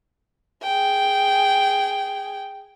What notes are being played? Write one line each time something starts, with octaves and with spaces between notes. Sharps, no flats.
G#4 G5